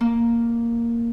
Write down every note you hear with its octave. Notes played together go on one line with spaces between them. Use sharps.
A#3